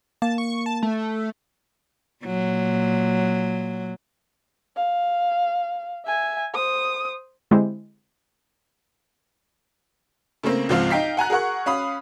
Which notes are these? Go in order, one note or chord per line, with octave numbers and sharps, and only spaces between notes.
A#3 A5
C#6
A5
A3
A#2 F#3
F5
E5 G#5
C5 D#6
D3 G#3 C4 E4 G4 C5
C#3 A3 A#3 C4
C#2 G#2 F3 C4 F5 F6
D#4 F5 G5 B6 C7
F#5 G#5 A#5 F#6
G#4 A#4 F#5 C#6
C#4 F5 B5 D#6